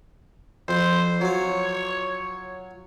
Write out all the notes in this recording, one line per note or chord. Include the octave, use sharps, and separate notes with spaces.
F2 C5
F#3 F4 C#5